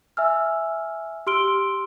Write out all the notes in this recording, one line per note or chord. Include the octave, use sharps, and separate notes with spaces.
E5 G#5 E6 F6
G4 C6 E6 F6 D7 G7